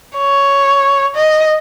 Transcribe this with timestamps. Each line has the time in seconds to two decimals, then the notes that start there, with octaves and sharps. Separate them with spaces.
0.18 C#5
1.16 D#5